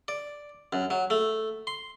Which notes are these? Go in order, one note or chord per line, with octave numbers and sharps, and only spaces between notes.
D5
F#2
F#3
A3
C6